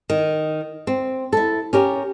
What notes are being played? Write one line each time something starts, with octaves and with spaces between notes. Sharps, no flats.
D#3
C4
E4 A4
C#4 G4 A#4